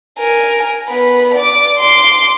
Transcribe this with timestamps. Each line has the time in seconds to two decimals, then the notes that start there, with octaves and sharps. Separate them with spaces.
0.19 A#4 G#5
0.88 B3 B5
1.34 D5 D6
1.78 C6 D6